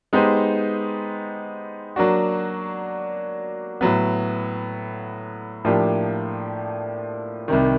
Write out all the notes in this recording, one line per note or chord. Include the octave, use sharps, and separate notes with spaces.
G#3 B3 D#4 G4 C5
F#3 A#3 D4 F#4
A2 F#3 B3
A2 F3 A#3 D4 G4
C2 C3 D#3